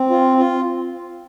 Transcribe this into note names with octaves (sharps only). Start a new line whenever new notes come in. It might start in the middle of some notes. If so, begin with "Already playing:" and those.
Already playing: C4
F4
F4